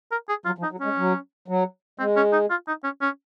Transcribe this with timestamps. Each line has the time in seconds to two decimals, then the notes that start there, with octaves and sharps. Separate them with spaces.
0.12 A#4
0.29 G#4
0.46 F#3 F4
0.58 F3
0.63 D#4
0.71 F#3
0.81 G#3 C#4
0.98 F#3
1.48 F#3
1.99 G#3 C4
2.17 C#4
2.33 D#4
2.50 F4
2.68 D#4
2.84 C#4
3.01 C#4